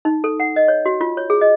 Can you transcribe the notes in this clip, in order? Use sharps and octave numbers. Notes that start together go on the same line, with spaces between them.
D#4
A4
F#5
D#5
C#5
F#4
F4
C#5
G#4
D#5